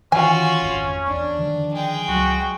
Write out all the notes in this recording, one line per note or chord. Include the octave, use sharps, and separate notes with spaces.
D#3 E3 C#4 F4 F#4 G#5
G#1 F2
E2 D4
D3 D#3 F3
G#3 G5
C#2 F#3 F#4